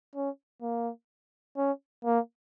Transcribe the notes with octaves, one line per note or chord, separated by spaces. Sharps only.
C#4
A#3
C#4
A#3